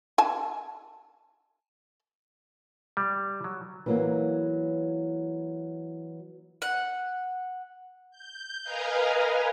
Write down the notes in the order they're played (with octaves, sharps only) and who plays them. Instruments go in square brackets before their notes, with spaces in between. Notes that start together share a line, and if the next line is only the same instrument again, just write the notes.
[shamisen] G#5 A5
[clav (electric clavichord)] G3
F#3
[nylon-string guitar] E3 F#3 A#3
[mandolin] F#5
[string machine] G6
A#4 B4 D#5 F5 G#5 A#5